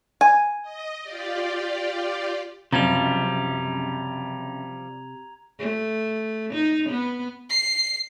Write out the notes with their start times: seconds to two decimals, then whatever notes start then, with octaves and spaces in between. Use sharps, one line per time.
0.21 G#5
0.62 D#5
1.02 F4 G4 D5
2.73 C#2 F#2 C3 F3 G3 A#5 G#6 F7
5.59 A3
6.53 D#4
6.89 B3
7.50 C7